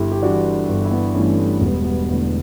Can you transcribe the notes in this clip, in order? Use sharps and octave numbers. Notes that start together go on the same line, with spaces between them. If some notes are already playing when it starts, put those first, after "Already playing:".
Already playing: G1 E4 G4
G4
G2 E3 D4 F#4
G1
E4
B3 D4
G2 E3 A3 C#4
A3
E1 G3 B3
G3 B3
E2 D3 A3